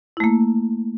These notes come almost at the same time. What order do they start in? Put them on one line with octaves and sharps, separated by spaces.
E4 A3 A#3